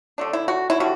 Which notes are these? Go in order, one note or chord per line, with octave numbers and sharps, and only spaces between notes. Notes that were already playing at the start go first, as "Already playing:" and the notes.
D3 A3 D4
E4
F#4
E4
D3 G3 F#4